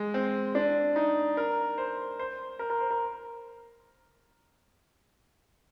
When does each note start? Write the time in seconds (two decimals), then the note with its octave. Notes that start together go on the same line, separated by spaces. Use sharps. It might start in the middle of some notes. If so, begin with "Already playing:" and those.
Already playing: G#3
0.14 C4
0.55 D4
0.96 D#4
1.37 A#4
1.78 C5
2.19 C5
2.59 A#4
2.70 A#4
2.80 C5
2.91 A#4